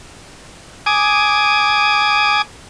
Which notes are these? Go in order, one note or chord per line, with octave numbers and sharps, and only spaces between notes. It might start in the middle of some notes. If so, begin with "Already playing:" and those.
G#5 D6 D#6